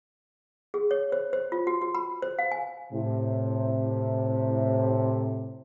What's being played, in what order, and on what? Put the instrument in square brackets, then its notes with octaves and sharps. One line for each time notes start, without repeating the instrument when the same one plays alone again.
[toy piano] G#4
C#5
C5
C5
F4
F#4
F#4
B5
C5
F5
G#5
[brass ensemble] A2 C3